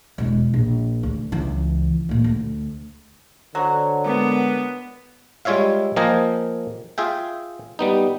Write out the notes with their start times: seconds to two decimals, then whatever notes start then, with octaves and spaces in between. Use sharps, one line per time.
0.18 E1 G#3
0.54 A#1
1.03 D2
1.32 C#2 E3
2.09 D2 A#2
2.24 D2
3.55 D3 F#3 C5 C#5 F#5
4.06 G#3 B3 A#4 D6
5.45 G3 G#3 F4 C#5 E5 F5
5.96 F3 A#3 A#4 D#5 G5 G#5
6.98 F4 G#4 E5 G5
7.79 G3 B3 D#4